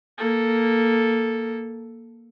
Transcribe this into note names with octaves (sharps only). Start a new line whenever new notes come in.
A#3 A4